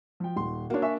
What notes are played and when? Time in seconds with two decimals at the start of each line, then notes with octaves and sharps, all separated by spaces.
0.20 F3 G5
0.36 D#1 C6
0.70 A#3 D4 F#4 C#5
0.82 E5 G#5 C#6